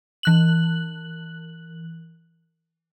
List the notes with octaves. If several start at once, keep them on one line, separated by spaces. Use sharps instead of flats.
E3 F#6 F#7